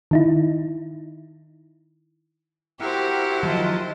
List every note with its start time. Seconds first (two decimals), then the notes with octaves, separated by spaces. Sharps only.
0.11 D#3 D#4 E4
2.80 C4 E4 F#4 G4 A#4 C5 F#5
3.43 D#3 F3 F#3 D#5 A5